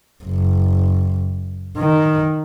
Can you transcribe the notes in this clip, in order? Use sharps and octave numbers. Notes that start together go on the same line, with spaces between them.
F#1
D#3